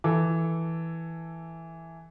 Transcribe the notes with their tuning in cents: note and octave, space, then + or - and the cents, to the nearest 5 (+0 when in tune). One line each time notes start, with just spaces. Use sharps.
E3 +0 A4 +0